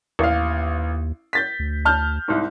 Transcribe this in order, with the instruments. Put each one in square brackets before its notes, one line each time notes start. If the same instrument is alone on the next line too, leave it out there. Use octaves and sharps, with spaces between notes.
[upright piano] A1 F5 [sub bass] D#2
[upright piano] G6 A6 B6
[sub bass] D2
[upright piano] A5 F6 G6
C2 G#2